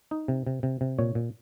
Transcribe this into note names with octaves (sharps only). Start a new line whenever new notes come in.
D#4
C3
C3
C3
C3
A#2 C#5
A#2